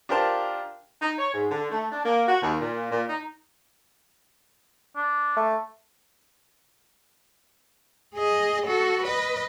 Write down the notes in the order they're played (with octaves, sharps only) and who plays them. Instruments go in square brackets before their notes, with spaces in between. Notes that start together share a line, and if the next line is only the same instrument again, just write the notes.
[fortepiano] D4 F4 G4 A#4 C5 A5
[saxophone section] D#4
C#5
G#2
D3
A3
D4
A#3
F#4
D#2
A#2
A#2
D#4
[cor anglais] D4
[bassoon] A3
[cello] G#4 D#5
F#4 A4
B4 D#5